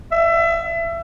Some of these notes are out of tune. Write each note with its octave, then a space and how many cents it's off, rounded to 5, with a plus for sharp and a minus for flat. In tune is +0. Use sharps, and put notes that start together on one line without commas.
E5 +25